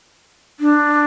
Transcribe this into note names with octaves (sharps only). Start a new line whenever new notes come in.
D4